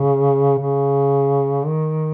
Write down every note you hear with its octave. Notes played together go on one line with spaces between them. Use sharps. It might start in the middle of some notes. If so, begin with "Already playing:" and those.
Already playing: C#3
C#3
D#3